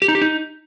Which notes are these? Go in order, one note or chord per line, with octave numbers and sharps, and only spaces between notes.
G4
D#4
G4
D#4